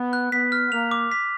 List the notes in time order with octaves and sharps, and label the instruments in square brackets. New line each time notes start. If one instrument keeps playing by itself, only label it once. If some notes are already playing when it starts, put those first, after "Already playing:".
Already playing: [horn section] B3
[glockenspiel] F#6
[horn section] B3 [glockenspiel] B6
[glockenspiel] F6
[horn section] A#3 [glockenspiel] F7
[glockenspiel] D6
B6